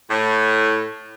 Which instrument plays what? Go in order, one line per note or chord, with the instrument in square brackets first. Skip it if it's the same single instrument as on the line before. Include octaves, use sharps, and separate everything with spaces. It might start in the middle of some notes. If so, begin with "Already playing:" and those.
[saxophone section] A2